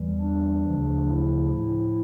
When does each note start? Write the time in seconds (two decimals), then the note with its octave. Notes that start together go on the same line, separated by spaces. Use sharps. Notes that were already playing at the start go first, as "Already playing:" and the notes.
Already playing: E2 E3 G3
0.21 D4
0.64 D2 C#3 F3
1.07 E4
1.50 A2 F3 E4